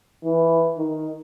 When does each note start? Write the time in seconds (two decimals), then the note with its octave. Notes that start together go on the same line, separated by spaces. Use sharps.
0.25 E3
0.78 D#3